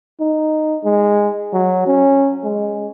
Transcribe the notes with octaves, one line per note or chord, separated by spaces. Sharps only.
D#4
G#3
F#3
C#4
G#3